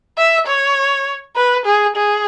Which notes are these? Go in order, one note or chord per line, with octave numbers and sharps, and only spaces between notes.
E5
C#5
B4
G#4
G#4